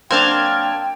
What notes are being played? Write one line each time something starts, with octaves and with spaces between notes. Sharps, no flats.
F#3 A#3 C4 D4 G5 A5 F6 G#6